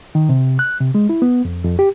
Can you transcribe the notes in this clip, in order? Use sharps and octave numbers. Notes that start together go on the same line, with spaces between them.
D#3
C3
F#6
C3
G#3
E4
B3
F2
F2
G4